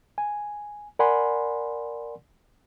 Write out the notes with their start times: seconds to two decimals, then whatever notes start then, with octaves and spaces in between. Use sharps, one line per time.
0.18 G#5
0.99 A#4 D5 F#5 G#5 B5 C6